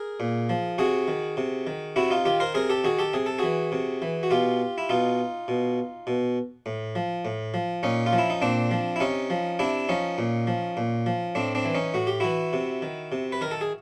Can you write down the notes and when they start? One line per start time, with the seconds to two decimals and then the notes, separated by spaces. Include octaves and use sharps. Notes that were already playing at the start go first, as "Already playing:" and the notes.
Already playing: G#4 A#4
0.20 A#2
0.49 F3
0.78 C3 F#4 G#4
1.08 D#3
1.37 C3
1.67 D#3
1.96 C3 E4 F#4
2.10 D#4 F4
2.25 D#3 F4 G4
2.40 A#4 C5
2.54 C3 G#4 A#4
2.70 G4 A4
2.84 D#3 F#4 G#4
2.99 G4 A4
3.13 C3 G#4
3.26 A4
3.39 E3 F#4 G#4
3.72 C3
4.02 E3
4.23 F#4
4.30 B2 F4 G4
4.78 E4
4.89 B2 D#4 F4
5.48 B2
6.07 B2
6.66 A2
6.95 F3
7.25 A2
7.54 F3
7.83 A#2 C#4 D#4
8.06 F4
8.13 F3
8.18 E4
8.30 D#4
8.42 A#2 C4 D4
8.71 F3
8.96 E4
9.00 C3 C#4 D#4
9.30 F3
9.59 C3 D4 E4
9.89 F3 C#4 D#4
10.18 A#2
10.47 F3
10.77 A#2
11.06 F3
11.35 A2 C4 D4
11.55 C4 D4
11.65 E3
11.75 C#4 D#4
11.94 A2 F#4
12.07 G4
12.20 E3 E4 F#4
12.53 C3
12.82 D#3
13.12 C3
13.32 B4
13.41 D#3 A#4
13.51 A4
13.61 G#4